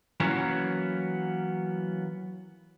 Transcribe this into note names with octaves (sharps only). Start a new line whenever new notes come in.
E3 F#3 A#3 B3 C#4